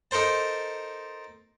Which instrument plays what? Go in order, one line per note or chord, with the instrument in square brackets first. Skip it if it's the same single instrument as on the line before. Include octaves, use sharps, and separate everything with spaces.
[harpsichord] D#4 A4 A#4 C5 A5